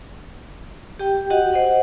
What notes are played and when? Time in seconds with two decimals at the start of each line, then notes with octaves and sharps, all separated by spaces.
0.99 G4 G5
1.30 F#4 G4 D#5 F#5
1.53 C5 D#5 F#5